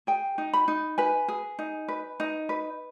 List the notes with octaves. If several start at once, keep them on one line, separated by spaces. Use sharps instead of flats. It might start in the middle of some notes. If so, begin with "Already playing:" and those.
G#4 G5
D#4
B5
D#4
B4 G#5
G#4
D#4
B4
D#4
B4